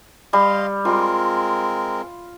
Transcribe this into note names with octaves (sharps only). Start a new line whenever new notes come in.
G3 D#5 F5 C6
G#3 C4 F4 A#4